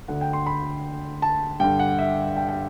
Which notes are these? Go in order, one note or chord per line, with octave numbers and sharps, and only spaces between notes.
D2 D3 F#5
G5
C6
B5
A5
G2 D3 G5
F#5
E5
G5
G5